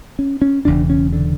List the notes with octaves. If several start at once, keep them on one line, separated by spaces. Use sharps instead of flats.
C#4
C#4
E1 E2 C#3 D4
C#4
D3